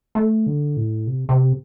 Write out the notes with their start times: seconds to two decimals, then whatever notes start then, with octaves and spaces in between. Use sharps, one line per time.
0.15 A3
0.46 D3
0.77 A2
1.07 C3
1.29 C3